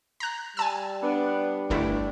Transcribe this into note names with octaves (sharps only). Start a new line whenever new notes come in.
A#5 F#6
G3 G#5 A5 E6
B3 D4
G1 G2 A3 D4 E4